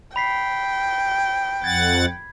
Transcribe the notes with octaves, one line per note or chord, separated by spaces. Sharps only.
G5 B5 B6 C7
F2 F#5 G#6 A6